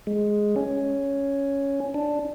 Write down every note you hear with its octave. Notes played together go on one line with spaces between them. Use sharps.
G#3
C#4
D4